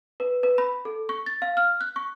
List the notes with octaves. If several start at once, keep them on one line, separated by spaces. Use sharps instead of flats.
B4
B4
B5
A4
C#6
A6
F5
F6
F#6
C#6